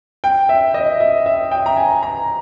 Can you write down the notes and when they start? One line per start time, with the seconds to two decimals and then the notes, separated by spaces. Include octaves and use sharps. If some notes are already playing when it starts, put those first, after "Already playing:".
0.24 G5
0.49 E5
0.74 D#5
1.00 E5
1.26 E5
1.51 G5
1.66 A#5
1.77 G#5
2.03 A#5